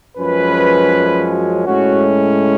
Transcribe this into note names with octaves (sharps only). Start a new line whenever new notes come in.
F#2 F3 G#3 C#4 B4
F#4
A2 G#3 C#4 F#4